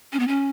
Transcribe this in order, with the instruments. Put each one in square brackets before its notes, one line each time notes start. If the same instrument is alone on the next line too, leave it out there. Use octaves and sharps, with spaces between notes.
[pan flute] C#4
B3
C#4